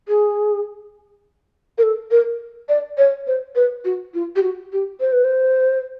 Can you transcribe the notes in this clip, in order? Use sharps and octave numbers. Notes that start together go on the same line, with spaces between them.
G#4
A#4
A4
A#4
D5
C#5
C5
B4
F#4
F4
G4
F#4
G4
C5
B4
C5